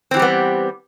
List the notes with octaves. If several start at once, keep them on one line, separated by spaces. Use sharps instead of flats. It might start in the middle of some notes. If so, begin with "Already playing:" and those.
E3 G3 B3 C4 G4